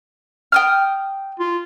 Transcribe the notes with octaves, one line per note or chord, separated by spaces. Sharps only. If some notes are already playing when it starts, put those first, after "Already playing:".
G5 D#6 F6
F4